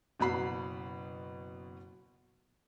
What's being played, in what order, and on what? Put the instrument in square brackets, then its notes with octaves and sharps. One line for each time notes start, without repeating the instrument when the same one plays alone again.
[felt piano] F#1 B2 F#4 B5 C7